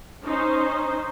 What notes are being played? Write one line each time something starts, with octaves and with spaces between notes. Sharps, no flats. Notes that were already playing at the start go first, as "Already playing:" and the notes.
C#4 D#4 C5